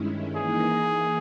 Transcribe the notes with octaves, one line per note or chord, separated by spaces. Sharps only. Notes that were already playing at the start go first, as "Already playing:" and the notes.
Already playing: G2 D#3 G#3 C#4 E4
E3 A#3 D#4 G#4